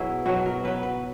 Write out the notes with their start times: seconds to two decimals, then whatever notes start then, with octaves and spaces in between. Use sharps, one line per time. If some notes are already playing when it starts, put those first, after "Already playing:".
Already playing: B2 F#3 E4 G#4
0.26 B2 F#3 F#4
0.46 A#4
0.64 B2 F#3 B4
0.83 B4